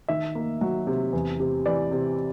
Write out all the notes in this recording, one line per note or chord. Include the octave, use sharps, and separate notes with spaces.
D#3 E5
A#3
F#3
C3
E2
C3
E3 D5
C3